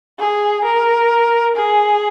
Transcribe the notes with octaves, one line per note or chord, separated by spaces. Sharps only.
G#4
A#4
G#4